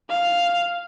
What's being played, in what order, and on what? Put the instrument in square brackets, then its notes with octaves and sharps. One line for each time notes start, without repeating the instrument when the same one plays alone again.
[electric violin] F5